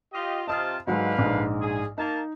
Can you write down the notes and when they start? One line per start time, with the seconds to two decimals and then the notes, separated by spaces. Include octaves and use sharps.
0.13 F4 G4 D#5
0.48 C3 F4 D#5 A5 D#6 F6
0.87 G#2 D3 F#3 G#3 B4 F5
1.19 A#1 G#2
1.61 G#4
1.98 A#3 D#4 A5